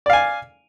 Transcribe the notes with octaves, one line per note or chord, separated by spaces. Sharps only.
D5 F5 G#5